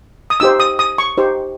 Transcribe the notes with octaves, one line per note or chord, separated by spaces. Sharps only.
D#6
D#4 G4 C5 E6
D#6
D#6
C#6
D#4 G4 C5